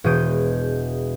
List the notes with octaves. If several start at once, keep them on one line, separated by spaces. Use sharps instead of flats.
E1 B2 G#3 D#6 G6 D7